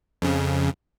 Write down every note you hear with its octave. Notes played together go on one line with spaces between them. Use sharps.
F2 C#3